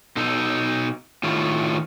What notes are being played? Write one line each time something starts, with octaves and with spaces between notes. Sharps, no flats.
B2 D#4 A4
A2 D#3 A3 F4